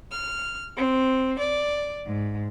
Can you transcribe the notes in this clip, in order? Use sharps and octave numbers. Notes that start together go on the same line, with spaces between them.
F6
C4
D5
G#2